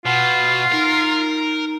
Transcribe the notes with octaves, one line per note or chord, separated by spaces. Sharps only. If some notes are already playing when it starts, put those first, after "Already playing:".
B2 F4 F#5
D#4 A#4